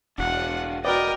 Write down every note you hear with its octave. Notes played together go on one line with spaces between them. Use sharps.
E1 D4 F#4 F5 F#5
F#4 A#4 B4 D5 D#5 G5